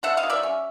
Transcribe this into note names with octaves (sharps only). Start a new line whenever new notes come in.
D4 E5 F#5
D#5 F5
F#3
D5 E5
C#4